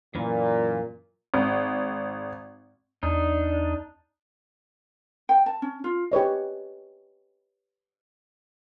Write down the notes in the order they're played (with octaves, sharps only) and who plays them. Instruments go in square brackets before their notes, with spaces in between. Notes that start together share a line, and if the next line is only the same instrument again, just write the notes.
[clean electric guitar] F#2 E3 [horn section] A#2
[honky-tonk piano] G#1
[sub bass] E2 [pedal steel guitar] D4 D#4
[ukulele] G5
A5
C#4
F4
[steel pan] G4 B4 C#5 D#5